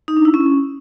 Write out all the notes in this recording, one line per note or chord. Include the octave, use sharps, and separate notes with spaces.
D#4
D4
E4
C#4